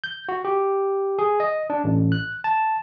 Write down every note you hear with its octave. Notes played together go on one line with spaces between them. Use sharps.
G6
F#4
G4
G#4
D#5
D4
A1
F#6
A5